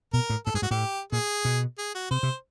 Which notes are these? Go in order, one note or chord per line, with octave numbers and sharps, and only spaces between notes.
B2 A#4
A2
G#2 A4
G2 G#4
G#2 F#4
A2 G4
A#2 G#4
B2
G#4
F#4
C3 C5
C3